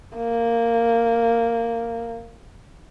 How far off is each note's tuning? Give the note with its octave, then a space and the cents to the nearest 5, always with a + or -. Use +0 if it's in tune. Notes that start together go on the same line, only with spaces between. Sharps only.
A#3 -10